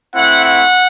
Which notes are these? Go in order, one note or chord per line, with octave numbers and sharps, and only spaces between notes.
A3 C4 E4 F#5
F#5